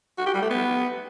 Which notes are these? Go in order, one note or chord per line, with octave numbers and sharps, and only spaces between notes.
F#4
G4
G3
A3
B3